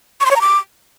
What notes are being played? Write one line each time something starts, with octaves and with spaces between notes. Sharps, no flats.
C#6
C6
C#5
A#5
D6